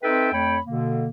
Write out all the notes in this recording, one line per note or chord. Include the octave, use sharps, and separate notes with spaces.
C4 D#4 A4 B4 E5 G5
F2 A3 C#5 G5 B5
B2 D3 A#3